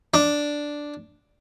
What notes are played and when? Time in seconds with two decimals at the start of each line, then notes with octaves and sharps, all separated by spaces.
0.14 D4